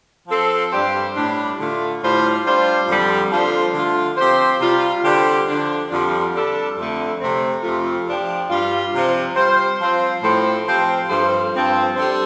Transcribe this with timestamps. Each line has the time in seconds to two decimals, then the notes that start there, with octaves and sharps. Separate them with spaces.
0.28 F3 C4 A4 C5
0.71 G2 G3 D4 G4 C5
1.15 A2 G3 D4
1.58 D3 A3 F4
2.01 A2 G3 F4 C5
2.44 G3 D4 F4 C5
2.87 F2 D3 G3
3.31 F3 D4 F4 A4 C5
3.74 D3 A3 F4
4.17 F3 C4 G4 C5
4.60 C3 G3 F4
5.04 D3 G3 D4 G4 C5
5.47 D3 F3 D4
5.90 F2 D3 G3 D4 F4
6.33 G3 D4 A4
6.76 F2 D3 A3
7.19 C3 A3 C4
7.63 F2 C3 A3 F4
8.06 F3 D4 G4
8.49 G2 G3 F4
8.93 C3 F3 C4
9.35 G3 F4 C5
9.80 F3 C4 F4 C5
10.22 A2 F3 C4 A4 C5
10.65 F3 C4 G4 C5
11.08 G2 F3 C4 A4 C5
11.51 G2 F3 C4 A4
11.95 G3 D4 A4 C5